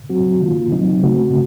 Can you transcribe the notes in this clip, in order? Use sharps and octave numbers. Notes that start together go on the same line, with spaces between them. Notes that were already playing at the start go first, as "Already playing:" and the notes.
F#3 C4 F#4
D#3 A#3 F4
C3 F#3 C4 D#4
C#3 A3 C4 F#4